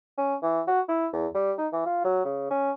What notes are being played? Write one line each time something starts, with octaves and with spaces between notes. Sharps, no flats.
C#4
E3
F#4
E4
E2
G3
D#4
E3
F4
F#3
C#3
C#4